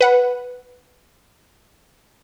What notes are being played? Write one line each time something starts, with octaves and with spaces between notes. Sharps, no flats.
B4 F#5